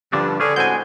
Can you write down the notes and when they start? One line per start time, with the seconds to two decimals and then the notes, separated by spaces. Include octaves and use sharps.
0.13 G2 D3 F3 D4
0.40 D3 C#4 G#4
0.56 A2 G#3 C4 F#4 G#5 G6